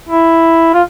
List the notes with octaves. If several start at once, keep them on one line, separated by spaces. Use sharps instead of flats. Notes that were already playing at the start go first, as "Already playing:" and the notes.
E4
F4